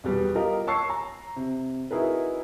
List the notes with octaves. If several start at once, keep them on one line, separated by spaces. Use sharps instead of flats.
E1 B2 G3 B3
F4 G4 A#4 D#5
C#5 A5 C#6 E6 C7
A#5
C3
D#4 E4 F#4 G#4 A#4 B4